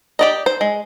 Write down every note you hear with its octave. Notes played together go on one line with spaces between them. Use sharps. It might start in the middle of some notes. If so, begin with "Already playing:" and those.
G4 D5 D#5
C5
G#3